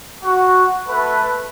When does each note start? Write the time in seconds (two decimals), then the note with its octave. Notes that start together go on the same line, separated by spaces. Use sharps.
0.24 F#4
0.89 A3 A4 B4